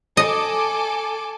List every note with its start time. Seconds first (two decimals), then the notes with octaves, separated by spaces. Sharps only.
0.17 A4 D#5 G#5 D6